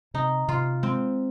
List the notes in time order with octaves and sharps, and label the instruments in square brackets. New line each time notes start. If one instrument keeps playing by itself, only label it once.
[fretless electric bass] C3 [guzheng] D#4
[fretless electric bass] C3 [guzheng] F4
[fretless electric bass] G#3 [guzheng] C4